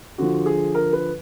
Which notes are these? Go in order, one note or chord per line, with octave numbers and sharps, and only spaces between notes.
D3 F3 F#4
G#4
A#4
B4